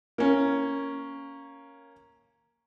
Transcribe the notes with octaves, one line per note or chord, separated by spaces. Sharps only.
A#3 C#4